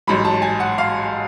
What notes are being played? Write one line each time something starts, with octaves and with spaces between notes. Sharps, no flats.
A1 G#2 F#3 B5
A5
G#5
F#5
F5